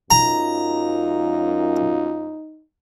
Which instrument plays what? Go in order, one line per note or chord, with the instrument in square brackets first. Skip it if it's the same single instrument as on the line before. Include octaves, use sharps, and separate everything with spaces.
[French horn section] F#2 F4 [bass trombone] D#4 [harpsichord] A#5